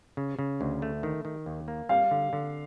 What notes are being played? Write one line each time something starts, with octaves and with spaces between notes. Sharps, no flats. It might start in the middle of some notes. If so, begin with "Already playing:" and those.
C#3
C#3
D2
A3
D#3
D#3
D#2
A#3
G3 F5
D3
D3